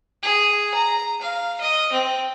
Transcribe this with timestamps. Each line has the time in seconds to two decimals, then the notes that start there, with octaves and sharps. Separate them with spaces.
0.23 G#4
0.74 A#5
1.22 F5
1.61 D#5
1.92 C4